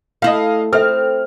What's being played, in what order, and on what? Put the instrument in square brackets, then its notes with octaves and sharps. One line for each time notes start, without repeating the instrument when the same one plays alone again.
[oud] A3 E4 [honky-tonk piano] D#5 F5
[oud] C4 [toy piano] A4 E5 [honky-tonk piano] F6